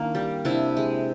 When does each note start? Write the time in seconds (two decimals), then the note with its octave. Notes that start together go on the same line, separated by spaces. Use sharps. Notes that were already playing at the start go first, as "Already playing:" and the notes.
Already playing: D#3 A#3 D4 E4
0.15 G3
0.45 C3 D4 E4
0.77 G#3